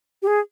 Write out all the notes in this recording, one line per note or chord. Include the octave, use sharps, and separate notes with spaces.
G4
G#4